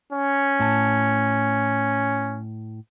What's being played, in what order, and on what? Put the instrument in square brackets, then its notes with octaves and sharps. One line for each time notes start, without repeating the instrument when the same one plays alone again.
[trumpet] C#4
[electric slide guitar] A2 A5